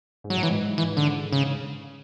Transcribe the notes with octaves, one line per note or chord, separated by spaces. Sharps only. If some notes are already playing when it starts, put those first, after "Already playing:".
G#2
F#3
A2
E3
G#2
E3
D3
C#3